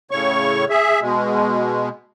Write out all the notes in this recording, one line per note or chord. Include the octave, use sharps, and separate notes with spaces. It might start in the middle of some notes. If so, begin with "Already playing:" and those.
A2 C#3 C#5 C#6
G#4 E5
B2 G#3